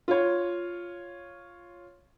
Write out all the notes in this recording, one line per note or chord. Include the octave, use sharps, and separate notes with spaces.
F4 C#5